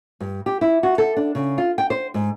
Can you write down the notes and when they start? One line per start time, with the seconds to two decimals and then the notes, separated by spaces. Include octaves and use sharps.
0.20 G2
0.46 G4
0.61 E4
0.83 F#4
0.98 A4
1.17 D4
1.35 C#3
1.58 F4
1.78 G5
1.90 C5
2.14 G#2